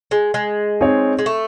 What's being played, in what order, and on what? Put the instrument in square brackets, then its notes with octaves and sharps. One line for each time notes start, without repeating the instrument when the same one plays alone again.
[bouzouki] G#3
G#3
[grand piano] C4 D#4 G#4 C#5
[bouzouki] G#3
A3